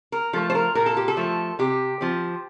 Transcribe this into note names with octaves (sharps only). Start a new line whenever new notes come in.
A#4
F3 A3 A4
C5
A#4
A#2 A#4
A4
G4
A4
F3 A3
C3 G4
F3 C4